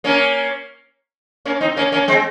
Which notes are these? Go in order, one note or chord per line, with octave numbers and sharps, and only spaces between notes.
A#3 C#4
A#3 C#4
C4 D#4
A#3 C#4
A#3 C#4
G#3 C4